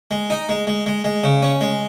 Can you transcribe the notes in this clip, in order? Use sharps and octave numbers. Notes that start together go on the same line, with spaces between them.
G#3
D#4
G#3
G#3
G#3
G#3
C#3
C#4
G#3